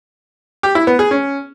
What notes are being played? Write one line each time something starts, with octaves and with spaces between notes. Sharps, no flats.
G4
E4
B3
G#4
C#4